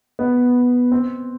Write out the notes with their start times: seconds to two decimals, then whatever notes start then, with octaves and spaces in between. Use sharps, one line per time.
0.19 B3
0.92 C4